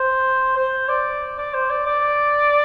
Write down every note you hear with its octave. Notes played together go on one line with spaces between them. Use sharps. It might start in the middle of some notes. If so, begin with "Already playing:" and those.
Already playing: C5
C5
D5
D5
C5
D5
D5